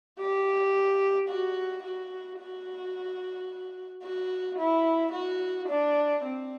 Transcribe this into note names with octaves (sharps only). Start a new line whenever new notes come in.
G4
F#4
F#4
F#4
F#4
E4
F#4
D4
C4